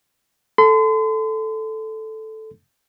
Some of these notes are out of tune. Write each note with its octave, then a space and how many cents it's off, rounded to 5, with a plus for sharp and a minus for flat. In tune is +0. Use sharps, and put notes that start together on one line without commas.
A4 -5 C6 -40